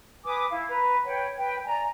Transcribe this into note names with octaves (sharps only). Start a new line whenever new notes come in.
B4 G#5 D6 D#6
E4 F5
B4 A#5
B4 C#5 F#5 G5
B4 G5
D5 G#5 A#5